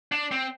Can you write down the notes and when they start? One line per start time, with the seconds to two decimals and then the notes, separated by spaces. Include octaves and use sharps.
0.12 D4
0.32 C4